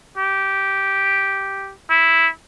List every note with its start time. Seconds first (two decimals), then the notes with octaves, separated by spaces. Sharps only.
0.17 G4
1.90 E4